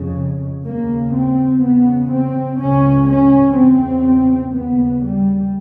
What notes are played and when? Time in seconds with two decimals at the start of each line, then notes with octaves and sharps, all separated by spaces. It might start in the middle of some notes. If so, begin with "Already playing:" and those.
Already playing: F2 C#3
0.65 D#2 C#3 A#3
1.15 C4
1.63 E2 C#3 B3
2.12 C4
2.60 C#2 C#3 C#4
3.08 C#4
3.56 E2 C#3 C4
4.54 D#2 C#3 B3
5.02 G3